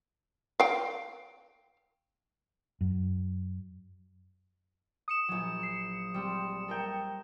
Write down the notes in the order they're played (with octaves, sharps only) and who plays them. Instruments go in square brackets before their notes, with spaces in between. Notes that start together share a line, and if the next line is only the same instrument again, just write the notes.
[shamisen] F5 G5
[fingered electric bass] F#2
[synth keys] D#6 C#7 E7
[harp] A#1 F#3
C7
G3 C4
A4 A#4 G5